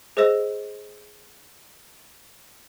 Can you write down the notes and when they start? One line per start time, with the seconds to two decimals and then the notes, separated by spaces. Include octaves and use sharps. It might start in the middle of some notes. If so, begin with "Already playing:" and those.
0.17 G#4 C5 D#5 E6 A#6 E7